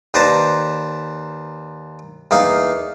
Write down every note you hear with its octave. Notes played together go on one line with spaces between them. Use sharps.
D#2 B4 C5 D5 A5 A#5
E2 A#3 D#4 F5